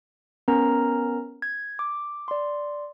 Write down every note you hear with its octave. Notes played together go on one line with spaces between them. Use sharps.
B3 C#4 A#4 A#5
G#6
D6
D5 C6